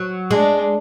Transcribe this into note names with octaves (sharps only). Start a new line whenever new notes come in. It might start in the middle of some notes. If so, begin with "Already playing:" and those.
Already playing: F#3
G#3 D4